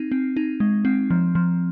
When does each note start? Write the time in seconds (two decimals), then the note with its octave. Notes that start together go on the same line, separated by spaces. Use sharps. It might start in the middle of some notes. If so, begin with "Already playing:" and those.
Already playing: C4 D#4
0.12 C4
0.37 D#4
0.60 G#3
0.85 C4
1.10 F3
1.35 F3